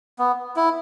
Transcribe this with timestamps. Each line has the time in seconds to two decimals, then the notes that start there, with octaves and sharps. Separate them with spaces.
0.19 B3
0.56 E4